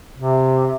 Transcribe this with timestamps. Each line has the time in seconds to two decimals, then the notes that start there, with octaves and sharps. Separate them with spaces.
0.16 C3